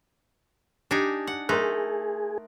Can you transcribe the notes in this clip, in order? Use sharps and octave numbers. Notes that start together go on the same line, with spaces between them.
D4 D#4 G4 G#5
F#5
A3 D#4 G#4 A#4 C6 F#6